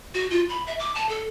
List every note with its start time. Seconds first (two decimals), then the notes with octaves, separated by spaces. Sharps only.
0.14 F#4
0.30 F4
0.49 B5
0.67 E5
0.79 D6
0.95 A5
1.09 A4